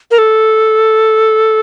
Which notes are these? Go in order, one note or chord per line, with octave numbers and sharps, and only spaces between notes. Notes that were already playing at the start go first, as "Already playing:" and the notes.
A#4
A4